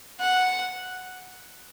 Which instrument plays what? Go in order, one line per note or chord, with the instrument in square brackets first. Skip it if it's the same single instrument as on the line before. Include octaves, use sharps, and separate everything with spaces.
[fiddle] F#5